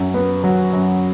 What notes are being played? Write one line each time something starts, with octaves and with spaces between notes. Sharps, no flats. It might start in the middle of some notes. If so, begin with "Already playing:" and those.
Already playing: F#2
B3
F#3
F#2